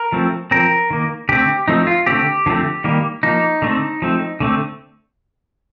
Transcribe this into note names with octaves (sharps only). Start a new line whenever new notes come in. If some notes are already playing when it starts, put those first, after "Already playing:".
Already playing: A#4
F3 A3 C4
F3 C4 A#4
D#3 A#3
D3 A3 C4 G4
F3 A3 C4 D#4
F4
D3 A3 C4 G4
D3 F3 A3 C4
D#3 G3 A#3
F3 A#3 D#4
D3 A3 C4
F3 A3 C4
D3 A3 C4